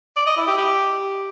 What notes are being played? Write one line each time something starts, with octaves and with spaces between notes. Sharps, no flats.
D5
D#5
E4
G4
G4